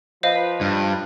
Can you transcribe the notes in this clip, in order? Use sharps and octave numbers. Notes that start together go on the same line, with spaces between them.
F3 B4 C5 D#5 F5
G2